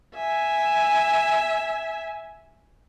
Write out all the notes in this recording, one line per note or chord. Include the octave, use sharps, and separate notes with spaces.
E5 G#5